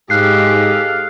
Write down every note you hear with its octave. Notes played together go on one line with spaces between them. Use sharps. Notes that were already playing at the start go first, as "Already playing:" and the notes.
G#2 G4 A4 D#5 F5 F#6 C7